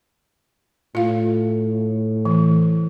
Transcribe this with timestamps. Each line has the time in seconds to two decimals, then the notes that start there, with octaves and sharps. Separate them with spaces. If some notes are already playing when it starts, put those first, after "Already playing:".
0.95 A2 F4 F5
2.25 E3